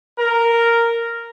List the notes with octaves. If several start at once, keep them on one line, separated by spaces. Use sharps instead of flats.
A#4